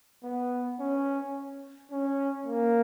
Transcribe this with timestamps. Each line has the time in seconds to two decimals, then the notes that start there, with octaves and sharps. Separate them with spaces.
0.24 B3
0.80 C#4
1.92 C#4
2.46 A#3